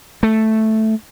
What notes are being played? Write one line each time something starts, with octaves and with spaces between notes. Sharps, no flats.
A3